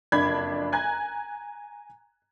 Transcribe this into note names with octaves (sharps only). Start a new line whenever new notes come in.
F#1 F2 D4 B5 G#6
G#5 A#5 F#6 G#6